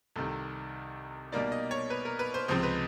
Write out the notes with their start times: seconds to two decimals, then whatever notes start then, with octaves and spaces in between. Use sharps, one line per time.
0.16 C2 C3 D#3 A4
1.32 B2 G3 A#3 D#4 D5
1.52 D#5
1.71 C#5
1.90 B4
2.05 A#4
2.19 B4
2.34 C5
2.48 C#2 C3 F3 G#3 C4 C5
2.63 B4